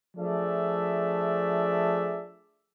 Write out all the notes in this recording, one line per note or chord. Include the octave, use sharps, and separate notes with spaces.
F3 A3 D4 G#4 D5 E5